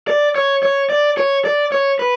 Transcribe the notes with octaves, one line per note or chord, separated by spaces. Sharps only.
D5
C#5
C#5
D5
C#5
D5
C#5
B4